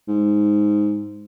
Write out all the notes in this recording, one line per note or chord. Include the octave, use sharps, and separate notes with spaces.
G#2